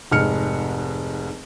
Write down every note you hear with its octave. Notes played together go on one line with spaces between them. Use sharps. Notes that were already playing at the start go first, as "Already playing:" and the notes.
F1 G#2 F6 C#7